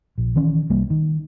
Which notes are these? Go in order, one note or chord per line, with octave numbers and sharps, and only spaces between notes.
A#1
D#3 E3 C#4
C2 G3 A#3
D#3